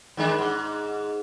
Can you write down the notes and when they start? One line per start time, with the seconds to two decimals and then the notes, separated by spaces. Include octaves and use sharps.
0.17 D#3 G#3 D4
0.38 G#2